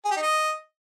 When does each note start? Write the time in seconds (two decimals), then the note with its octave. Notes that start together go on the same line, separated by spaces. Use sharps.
0.05 G#4
0.11 G4
0.17 D#4
0.23 D#5